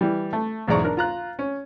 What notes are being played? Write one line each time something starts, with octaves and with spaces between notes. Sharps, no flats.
E3 G3
A3
B1 E2 G#2 D5 A#5 C#6
D4 A#4
F4 A#5 F#6
C#4